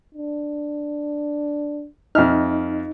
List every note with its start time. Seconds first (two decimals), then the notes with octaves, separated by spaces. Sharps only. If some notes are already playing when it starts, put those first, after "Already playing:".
0.15 D4
2.15 F2 D#4 E5 F6